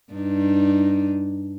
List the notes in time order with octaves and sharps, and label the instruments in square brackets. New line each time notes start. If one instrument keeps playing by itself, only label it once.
[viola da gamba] G2 D4 D#4